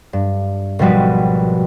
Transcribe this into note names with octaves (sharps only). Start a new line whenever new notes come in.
G2
G#1 B2 F3 G3 F#4 B4